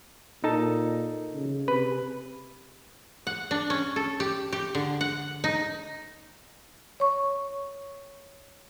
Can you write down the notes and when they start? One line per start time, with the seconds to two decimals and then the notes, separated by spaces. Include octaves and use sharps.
0.44 A#2 D#4 A4 A5
1.34 C#3
1.68 C3 B4
3.27 F#5
3.51 D4
3.70 C#4
3.96 A4
4.20 G4
4.53 G4
4.75 D3
5.01 F#5
5.44 D#4
7.00 C#5 C#6